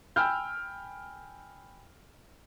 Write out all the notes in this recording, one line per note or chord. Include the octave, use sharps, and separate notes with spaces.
G5 G#5 B5 E6 F6 G6